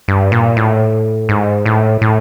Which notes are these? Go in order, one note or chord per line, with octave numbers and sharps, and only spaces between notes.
G2
A#2
A2
G#2
A2
A2